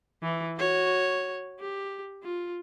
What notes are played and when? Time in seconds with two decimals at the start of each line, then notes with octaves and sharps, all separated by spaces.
0.23 E3
0.57 F#4 C#5
1.60 G4
2.23 F4